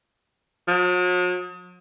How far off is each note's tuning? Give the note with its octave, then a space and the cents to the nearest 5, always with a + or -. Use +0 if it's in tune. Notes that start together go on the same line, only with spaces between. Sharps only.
F#3 -45